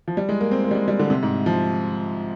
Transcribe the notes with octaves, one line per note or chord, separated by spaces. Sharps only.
F3
G3
G#3
A#3
C4
A#3
G3
G#3
G3
D3
C3
G#2
F3